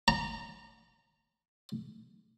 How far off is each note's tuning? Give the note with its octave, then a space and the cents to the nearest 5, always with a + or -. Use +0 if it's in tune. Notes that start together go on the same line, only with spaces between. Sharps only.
A#5 -20